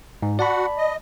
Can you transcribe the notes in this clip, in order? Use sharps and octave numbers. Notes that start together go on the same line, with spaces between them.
G#2
F#4 D5 F#5 A5 B5
D#5